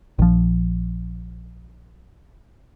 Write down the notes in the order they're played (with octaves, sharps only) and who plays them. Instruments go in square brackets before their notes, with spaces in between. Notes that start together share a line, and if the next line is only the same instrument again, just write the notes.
[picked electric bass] A#1 F3